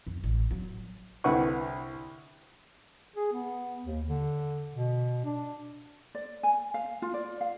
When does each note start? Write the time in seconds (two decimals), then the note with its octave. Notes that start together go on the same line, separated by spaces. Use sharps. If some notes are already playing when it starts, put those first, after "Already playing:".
0.07 F2
0.24 A1
0.51 F#3
1.24 C2 D3 B4 F#5 C#6
3.16 G#4
3.33 B3
3.86 D#2
4.07 D3
4.75 B2
5.25 D4
6.15 D5
6.43 G#5
6.74 F5
7.02 F4
7.14 D5
7.41 F5